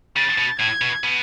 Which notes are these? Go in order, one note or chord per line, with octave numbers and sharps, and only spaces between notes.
C#3 A6
B2
A2 G#6
B2
B2